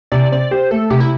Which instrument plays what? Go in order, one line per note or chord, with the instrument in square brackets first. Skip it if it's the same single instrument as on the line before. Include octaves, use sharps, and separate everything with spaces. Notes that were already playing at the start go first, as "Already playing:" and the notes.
[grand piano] C3 [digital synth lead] D5
[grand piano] C4 [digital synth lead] D5
[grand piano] G4 [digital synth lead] C5
[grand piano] A3 [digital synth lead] A4
[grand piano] C3 [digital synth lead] G4
[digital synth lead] E4